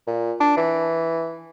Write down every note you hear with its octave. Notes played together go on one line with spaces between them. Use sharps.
A#2
D4
E3